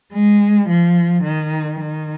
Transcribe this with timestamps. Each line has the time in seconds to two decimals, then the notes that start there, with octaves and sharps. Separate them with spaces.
0.12 G#3
0.67 F3
1.22 D#3
1.78 D#3